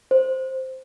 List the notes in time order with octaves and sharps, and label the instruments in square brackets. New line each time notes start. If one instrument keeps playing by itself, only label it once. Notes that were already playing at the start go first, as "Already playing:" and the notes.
[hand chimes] C5